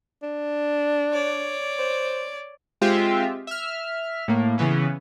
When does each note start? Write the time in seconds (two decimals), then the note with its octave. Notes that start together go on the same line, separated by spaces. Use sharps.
0.23 D4
1.12 C#5 D5
1.79 C5
2.81 G#3 C4 F4 G4 E5
3.47 E5 F6
4.28 A2 A#3
4.58 C#3 E3 B3 C#4